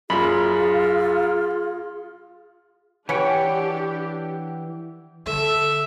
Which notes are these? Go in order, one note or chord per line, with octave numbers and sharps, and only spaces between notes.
F#2 F4 G#4 B5
E3 C#4 D4 G4 B4 C#5 F#5 G5
D3 A4 E5